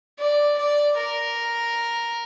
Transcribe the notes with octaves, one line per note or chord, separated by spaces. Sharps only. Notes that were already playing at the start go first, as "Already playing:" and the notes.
D5
D5
A#4